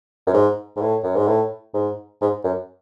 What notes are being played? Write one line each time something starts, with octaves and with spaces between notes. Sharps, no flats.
F#2
G#2
G#2
A2
F#2
G#2
A2
G#2
G#2
F#2